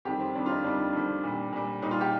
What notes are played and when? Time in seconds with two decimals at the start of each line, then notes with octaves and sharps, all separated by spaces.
0.05 F2 D#3 G3 G4
0.20 C4
0.35 F2 D#3 G3 D4
0.46 F4
0.49 D#4
0.64 F2 D#3 G3 D4
0.93 F2 D#3 G3
1.24 A#2 G3
1.52 A#2 G3
1.82 A#2 G3 D#4
1.91 F4
2.01 G4